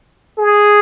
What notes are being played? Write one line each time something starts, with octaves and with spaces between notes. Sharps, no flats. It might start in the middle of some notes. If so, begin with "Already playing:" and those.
G#4